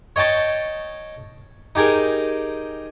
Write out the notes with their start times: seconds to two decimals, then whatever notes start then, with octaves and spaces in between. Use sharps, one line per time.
0.16 C#5 D#5 G5 A5 C#6
1.75 D#4 G4 G#4 A#4